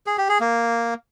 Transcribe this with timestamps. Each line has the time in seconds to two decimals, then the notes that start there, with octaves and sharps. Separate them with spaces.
0.07 G#4
0.18 G4
0.29 G#4
0.40 A#3